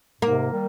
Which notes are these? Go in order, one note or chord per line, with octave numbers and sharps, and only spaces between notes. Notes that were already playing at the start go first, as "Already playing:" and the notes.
G#2 C3 A#3
D#3 G3